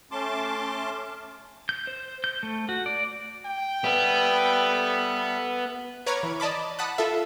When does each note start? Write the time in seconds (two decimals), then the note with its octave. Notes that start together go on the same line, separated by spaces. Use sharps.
0.11 A3 C#4 A5 C6 D6
1.69 G6
1.87 C5
2.24 G6
2.43 A3
2.69 F#4
2.86 D5
3.45 G5
3.84 G3 B3 A4 E5
6.06 B4 C#5 A#5 D6 F6 G#6
6.23 E3
6.40 D5 D#5 A5 B5 D6
6.79 F#5 A5 B5 D#6 F#6
6.98 F4 A4 E5